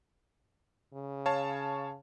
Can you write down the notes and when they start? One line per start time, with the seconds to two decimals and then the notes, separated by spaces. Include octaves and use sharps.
0.94 C#3
1.26 C#5 F5 A5